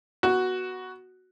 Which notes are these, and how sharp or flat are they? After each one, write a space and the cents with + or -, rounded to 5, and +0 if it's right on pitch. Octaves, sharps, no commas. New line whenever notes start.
B3 -25 F#4 +0